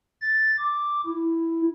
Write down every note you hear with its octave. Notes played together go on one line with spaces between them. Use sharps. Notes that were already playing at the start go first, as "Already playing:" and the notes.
A6
D6
E4